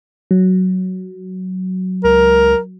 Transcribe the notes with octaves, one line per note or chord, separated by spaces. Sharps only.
F#3
C#2 A#4